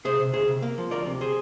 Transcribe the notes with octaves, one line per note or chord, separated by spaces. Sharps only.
C3 G#4 C5
C3
D2 G#4 C5
C3
A#3
F3
D2 A#4 D5
C3
G#4 C5